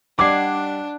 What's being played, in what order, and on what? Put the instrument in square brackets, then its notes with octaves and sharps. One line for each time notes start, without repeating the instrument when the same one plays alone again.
[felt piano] G3 D#5 [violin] D4 [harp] F#5 G#5 C7 [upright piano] D6